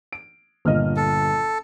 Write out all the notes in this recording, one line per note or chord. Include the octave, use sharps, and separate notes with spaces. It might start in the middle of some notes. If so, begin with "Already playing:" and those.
D7
G1 A#2 D#5 F6
A4